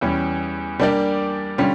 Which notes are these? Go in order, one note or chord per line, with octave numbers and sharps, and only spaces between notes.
E2 E3 G3 C#4
G3 A#3 D4 G4 D5
D3 G3 C#4 F4